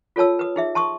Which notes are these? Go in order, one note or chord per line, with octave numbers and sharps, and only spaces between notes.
F4 A4 C#5 A5 E6
B4 D#6
D#4 G#4 E5
A5 C6 C#6 D#6